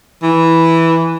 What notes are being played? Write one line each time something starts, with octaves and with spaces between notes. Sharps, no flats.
E3